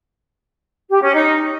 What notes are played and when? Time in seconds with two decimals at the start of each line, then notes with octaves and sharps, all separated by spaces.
0.90 G4
1.02 C#4
1.14 D#4